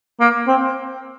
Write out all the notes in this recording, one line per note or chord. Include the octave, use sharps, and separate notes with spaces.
A#3
C4